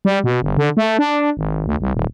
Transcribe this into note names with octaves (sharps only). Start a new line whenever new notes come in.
G3
B2
G1
D3
A3
D4
G#1
D2
C2
D#1